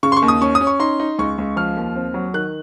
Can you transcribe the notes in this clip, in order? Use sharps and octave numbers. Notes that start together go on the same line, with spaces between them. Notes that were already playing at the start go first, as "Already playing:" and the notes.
C#3 C#6
C6
C#6
D#2
D#6
C#4 C#6
D#6
C#4
C#6
D#4 C6
D#4
C#2 C#6
C#2
F3 F6
D#2
C4
F#3
D#3 F#6